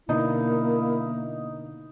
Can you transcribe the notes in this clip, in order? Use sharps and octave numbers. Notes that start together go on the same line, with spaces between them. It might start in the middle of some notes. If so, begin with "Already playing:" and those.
B2 D3 A#3 D#4 E4